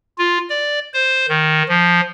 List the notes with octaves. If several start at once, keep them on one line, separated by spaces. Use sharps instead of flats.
F4
D5
C5
D#3
F3